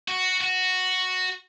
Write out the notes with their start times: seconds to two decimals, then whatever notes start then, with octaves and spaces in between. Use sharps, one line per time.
0.08 F#4
0.41 F#4